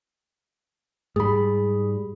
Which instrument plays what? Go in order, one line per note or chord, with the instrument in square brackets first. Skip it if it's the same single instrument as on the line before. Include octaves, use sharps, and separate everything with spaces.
[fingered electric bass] G#2 G3 [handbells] G#4 B5